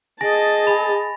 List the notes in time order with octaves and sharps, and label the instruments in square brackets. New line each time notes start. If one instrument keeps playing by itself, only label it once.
[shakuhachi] G#4 [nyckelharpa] D#5 A5 [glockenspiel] G#5 A6 A#6
[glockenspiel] B5